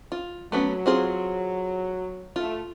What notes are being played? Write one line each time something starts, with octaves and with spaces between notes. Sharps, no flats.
F4
F#3 A3 B3 C#4
C4 F4 G#4
A3 F4